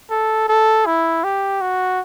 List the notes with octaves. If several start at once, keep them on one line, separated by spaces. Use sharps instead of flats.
A4
A4
E4
G4
F#4